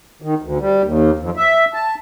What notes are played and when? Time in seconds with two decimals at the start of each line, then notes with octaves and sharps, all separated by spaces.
0.22 D#3
0.42 D2
0.60 G3
0.83 D#2
1.19 F2
1.37 E5
1.74 A5